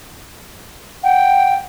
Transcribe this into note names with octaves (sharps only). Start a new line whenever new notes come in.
F#5 G5